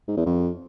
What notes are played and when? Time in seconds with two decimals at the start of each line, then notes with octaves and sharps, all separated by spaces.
0.08 G#2
0.17 E2
0.26 F2